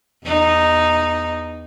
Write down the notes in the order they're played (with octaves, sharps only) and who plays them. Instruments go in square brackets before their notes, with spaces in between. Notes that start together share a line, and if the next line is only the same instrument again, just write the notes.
[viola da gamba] E2 D#4